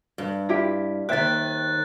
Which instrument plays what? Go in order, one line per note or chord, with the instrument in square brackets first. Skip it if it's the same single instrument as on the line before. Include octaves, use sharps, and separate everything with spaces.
[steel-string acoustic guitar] G2
[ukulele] E4 F4 G4
[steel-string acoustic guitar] D#2 D#3 [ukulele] C5 E5 G5 [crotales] F#6 A6